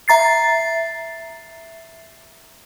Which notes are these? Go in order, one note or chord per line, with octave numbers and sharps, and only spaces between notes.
E5 A#5 A6 C7